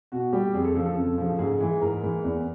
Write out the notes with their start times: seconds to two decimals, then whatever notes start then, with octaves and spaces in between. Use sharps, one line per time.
0.12 B2 F#4
0.33 G3 G4
0.54 F2 G#4
0.64 A4
0.75 C#3 F3
0.85 A4
0.96 F2
1.18 C#3 F3
1.39 G#2 G#4
1.60 E3 G#3
1.81 G#2 A#4
2.03 E3 G#3
2.24 E2